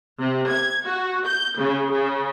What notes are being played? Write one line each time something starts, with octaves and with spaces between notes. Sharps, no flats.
C3
G#6
F#4
G6
C#3
C#3